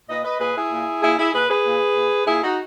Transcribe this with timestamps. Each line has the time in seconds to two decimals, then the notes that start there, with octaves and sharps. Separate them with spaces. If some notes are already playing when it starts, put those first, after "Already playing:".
0.09 A#2 B4 D#5
0.25 B4 D#5
0.40 A#2 G#4 B4
0.56 E4 G#4
0.71 A#2
1.02 A#2 E4 G#4
1.18 E4 G#4
1.34 A#2 G#4 B4
1.50 G#4 B4
1.65 A#2
1.95 A#2
2.26 A#2 E4 G#4
2.43 D#4 F#4